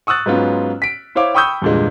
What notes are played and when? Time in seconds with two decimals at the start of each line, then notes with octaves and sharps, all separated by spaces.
0.07 C#6 D#6 E6 F#6 A6
0.26 G#2 F#3 B3 C#4 F4
0.82 B6 D7
1.15 E4 C5 C#5 F5 D6
1.35 G5 B5 C#6 D#6 E6 G6
1.62 E2 G2 A#2 D3 G#3